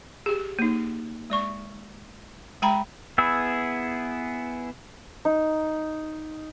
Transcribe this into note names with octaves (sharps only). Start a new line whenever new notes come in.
G4 G#4
A#3 D#4
G#3 D5 C#6
G#3 G5 A#5 B5
B3 E4 G#4 E6
D#4